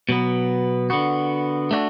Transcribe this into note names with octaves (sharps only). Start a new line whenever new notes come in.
B2 F#3 B3
D3 B3 F#4
A3 D4 F#4